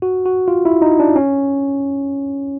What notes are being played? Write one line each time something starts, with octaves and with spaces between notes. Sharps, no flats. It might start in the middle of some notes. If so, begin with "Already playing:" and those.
F#4
F#4
F4
E4
D#4
D4
C#4